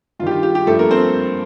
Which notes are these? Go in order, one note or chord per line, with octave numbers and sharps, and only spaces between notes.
G2 D#3 F4 G4
F4
G4
G4
G2 F3 A3 A4
A#3 A#4
C4 C5